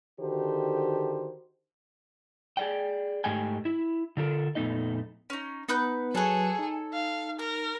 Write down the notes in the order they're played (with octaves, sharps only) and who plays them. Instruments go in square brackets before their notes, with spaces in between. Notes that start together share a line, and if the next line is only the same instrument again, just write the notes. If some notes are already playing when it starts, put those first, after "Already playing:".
[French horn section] D3 D#3 F#4 G4 A4 C5
[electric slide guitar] G#4 D5 G5
G#2 A3 G4 D#5 G5 G#5
E4
D3 F4 A4 A#4
F2 A#2 A3 B3 D#4 D#5
[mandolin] C#4 D#4
[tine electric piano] B3 [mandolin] D#4 B4 G6
[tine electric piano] F#3 B4 F#6 [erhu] G#4 [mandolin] A4 C#5
[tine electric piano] D#4
[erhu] F5
[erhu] A#4 [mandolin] F6